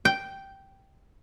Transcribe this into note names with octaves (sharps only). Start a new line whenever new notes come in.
G5